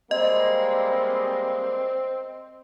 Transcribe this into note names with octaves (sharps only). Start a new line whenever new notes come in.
G3 G#3 A#3 C4 D#5